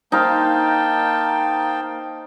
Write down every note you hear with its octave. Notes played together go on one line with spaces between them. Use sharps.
A#3 D#4 C5 F5 G5 A5